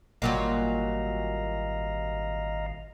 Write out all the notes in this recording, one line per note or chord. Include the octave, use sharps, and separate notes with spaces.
G#1 A#2 F#3 G3 D#5 F5 A#5